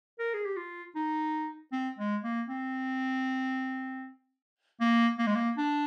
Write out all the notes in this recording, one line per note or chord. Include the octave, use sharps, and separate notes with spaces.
A#4
G#4
G4
F4
D#4
C4
G#3
A#3
C4
A#3
A#3
G#3
A#3
D4